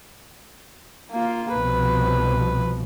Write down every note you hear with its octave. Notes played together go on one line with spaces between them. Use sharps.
A#3 F4
C2 B2 F3 B4